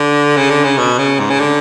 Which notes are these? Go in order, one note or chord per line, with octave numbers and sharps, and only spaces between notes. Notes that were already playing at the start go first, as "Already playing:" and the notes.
Already playing: D3
C#3
D3
C#3
B2
C#3
G#2
C#3
D3